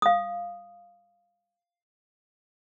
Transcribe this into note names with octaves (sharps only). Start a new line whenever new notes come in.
F5 D#6